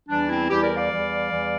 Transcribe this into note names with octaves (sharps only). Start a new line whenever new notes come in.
E2 E3 G3 D4
C4 E4
E2 E3 G3 E4 G4
A#4 D5
D5 F5
E2 E3 G3
E2 E3 G3